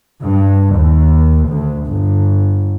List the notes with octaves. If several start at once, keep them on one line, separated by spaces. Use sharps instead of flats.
G2
D#2
D2
G1